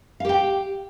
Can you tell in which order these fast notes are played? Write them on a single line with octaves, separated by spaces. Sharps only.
F5 G4 G5